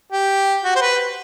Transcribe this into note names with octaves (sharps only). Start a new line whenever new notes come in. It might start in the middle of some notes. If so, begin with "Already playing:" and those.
G4
F#4
C5
B4